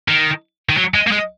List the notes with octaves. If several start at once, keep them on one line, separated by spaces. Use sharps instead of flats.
D#3
D#3
F#3
G#3
A#3
G#3